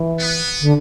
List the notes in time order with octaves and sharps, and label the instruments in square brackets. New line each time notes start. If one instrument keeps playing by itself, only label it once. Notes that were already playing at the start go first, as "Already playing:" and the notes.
Already playing: [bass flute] E3
[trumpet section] B3
[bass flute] D3